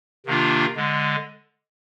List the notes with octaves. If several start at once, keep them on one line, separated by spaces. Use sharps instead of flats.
C3 D#3 A#3 D4 F4
D3 G#3